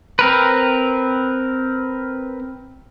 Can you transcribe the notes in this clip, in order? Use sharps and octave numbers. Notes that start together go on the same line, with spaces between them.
C4 A#4 B4